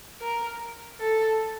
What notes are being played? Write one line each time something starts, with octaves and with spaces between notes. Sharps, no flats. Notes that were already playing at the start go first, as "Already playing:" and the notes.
A#4
A4